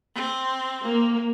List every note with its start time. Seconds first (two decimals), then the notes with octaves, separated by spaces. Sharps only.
0.15 C4
0.84 A#3